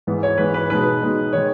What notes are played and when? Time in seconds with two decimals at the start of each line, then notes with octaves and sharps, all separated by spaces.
0.07 G#2 E3 B3
0.23 C#5
0.38 G#2 E3 B3 B4
0.54 B4
0.70 B2 G#3 D#4 B4
1.02 B2 G#3 D#4
1.33 D#3 G#3 C#5